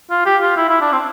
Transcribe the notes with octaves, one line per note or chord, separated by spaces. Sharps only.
F4
G4
F4
E4
E4
D4
C4